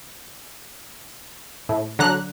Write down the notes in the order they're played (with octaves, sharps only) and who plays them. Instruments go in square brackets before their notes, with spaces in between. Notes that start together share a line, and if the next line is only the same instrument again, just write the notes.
[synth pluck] A2
D3 F#3 A#5 F#6